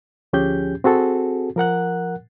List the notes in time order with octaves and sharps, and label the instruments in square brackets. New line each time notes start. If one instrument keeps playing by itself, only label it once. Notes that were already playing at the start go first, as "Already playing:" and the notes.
[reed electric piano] D2 F3 C#4 G4 G#4 G6
C4 F#4 G#4 A4
F3 A#4 F#5 F#6